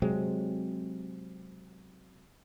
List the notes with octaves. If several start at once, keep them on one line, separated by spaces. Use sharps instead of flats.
C3 F#3 G#3 C4